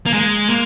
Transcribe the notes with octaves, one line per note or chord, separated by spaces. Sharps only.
A#3
G#3
A#3